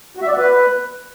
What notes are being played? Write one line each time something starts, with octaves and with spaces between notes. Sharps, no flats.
F#4
E5
D5
F#4
B4